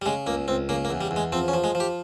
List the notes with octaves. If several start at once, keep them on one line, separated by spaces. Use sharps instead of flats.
G3
C#3 G#3
C#2 A#3
C#2 C4
C#3 A#3
A#3
E2
G3
E2
G#3
F3 C4
C#4
F3
G#3
F3
G4